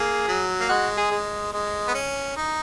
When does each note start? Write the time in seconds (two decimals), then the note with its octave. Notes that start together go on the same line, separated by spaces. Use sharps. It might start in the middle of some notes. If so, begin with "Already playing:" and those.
Already playing: A#3 G#4
0.28 F#3
0.60 A#3
0.69 G#3 F#4
0.97 G#4
1.11 G#3
1.53 G#3
1.88 B3
1.94 C#4
2.37 D#4